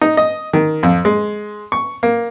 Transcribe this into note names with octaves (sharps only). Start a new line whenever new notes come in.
D#4
D#5
D#3
F2
G#3
C#6
A#3